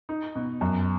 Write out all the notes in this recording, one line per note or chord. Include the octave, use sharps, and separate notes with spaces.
D#4
B2
F#2